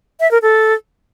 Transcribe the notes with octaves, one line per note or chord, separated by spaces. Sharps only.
E5
A#4
A4